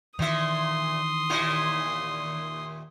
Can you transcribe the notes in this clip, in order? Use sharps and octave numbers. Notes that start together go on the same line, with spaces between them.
A#2 D#3 E3 E5 C6 D#6
D#2 A#2 E4